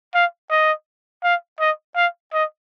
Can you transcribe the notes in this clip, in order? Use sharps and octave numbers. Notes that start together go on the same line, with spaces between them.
F5
D#5
F5
D#5
F5
D#5